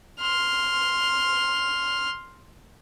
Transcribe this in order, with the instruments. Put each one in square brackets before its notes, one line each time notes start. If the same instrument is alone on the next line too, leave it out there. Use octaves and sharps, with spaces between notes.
[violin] C6 F6